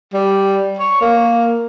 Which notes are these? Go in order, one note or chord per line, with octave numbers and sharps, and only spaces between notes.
G3
C#5
A#3